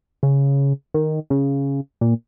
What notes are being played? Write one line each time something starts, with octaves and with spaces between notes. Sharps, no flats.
C#3
D#3
C#3
A#2